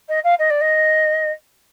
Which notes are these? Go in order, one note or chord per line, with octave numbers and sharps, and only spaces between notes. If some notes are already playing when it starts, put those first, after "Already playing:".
D#5
F5
D#5
D5
D#5